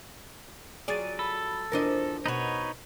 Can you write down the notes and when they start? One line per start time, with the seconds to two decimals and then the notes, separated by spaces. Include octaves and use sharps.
0.88 F#3 F4 G#4 D5 A6 D#7
1.19 A4 B5
1.72 E2 F3 D4 A#4 D#5
2.26 B2 D#4 F#4 B4 C#5